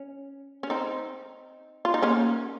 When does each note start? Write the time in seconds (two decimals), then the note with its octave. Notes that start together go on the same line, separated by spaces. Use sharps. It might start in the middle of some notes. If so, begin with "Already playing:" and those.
Already playing: C#4
0.63 C#4
0.70 C4 D#4
1.85 F4
1.94 D#4
2.02 A#3 C#4